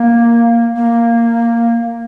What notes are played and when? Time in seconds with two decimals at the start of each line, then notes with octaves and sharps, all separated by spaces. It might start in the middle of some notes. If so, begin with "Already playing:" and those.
Already playing: A#3
0.76 A#3